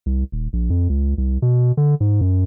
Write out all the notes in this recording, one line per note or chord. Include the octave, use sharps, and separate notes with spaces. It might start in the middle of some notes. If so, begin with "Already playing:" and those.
C2
D#1
A#1
F2
C#2
C2
B2
D3
G#2
F#2